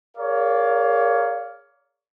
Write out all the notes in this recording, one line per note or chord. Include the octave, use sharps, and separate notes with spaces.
G#4 A#4 C#5 D5 F5